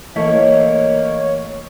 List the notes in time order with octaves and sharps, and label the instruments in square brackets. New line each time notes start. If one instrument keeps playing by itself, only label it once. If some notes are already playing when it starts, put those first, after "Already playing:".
[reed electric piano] E3 A3 [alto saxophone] A#3 [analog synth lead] C#5 [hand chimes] D#5 B6